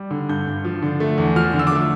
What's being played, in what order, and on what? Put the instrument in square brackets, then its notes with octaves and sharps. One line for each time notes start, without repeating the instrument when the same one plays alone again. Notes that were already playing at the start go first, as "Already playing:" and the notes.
Already playing: [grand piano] G3
D3
G2 G6
G2
F3
D3
A3
E2
F3 F6
D3
E6
D6
A3 E6